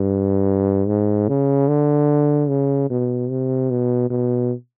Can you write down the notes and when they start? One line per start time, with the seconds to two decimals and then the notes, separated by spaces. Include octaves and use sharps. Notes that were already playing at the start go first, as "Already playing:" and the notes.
Already playing: G2
0.88 G#2
1.28 C#3
1.68 D3
2.49 C#3
2.90 B2
3.30 C3
3.70 B2
4.10 B2